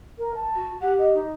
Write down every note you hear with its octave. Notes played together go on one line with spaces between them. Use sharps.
A#4
A5
F#4
G4 F#5
D#5
D#4